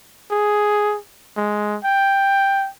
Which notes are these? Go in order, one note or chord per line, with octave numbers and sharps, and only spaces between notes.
G#4
G#3
G5